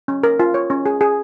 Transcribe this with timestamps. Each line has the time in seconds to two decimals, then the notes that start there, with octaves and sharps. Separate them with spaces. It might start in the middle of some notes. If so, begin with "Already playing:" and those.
0.08 C#4
0.23 A#4
0.40 F4
0.54 C#5
0.70 C#4
0.86 G#4
1.01 G#4